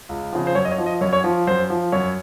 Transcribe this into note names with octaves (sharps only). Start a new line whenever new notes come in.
C#2
C#3 F3
C5
F#2 C#5
D#5
C#5
F3
D#5
F#2 C#5
C#5
F3
F#2 C5
F3
F#2 C#5